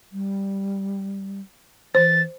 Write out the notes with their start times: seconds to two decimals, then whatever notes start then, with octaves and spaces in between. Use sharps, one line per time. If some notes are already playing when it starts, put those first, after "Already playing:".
0.12 G3
1.95 E3 C5 A6